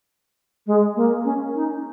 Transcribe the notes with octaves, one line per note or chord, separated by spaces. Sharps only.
G#3
A#3
C#4
D#4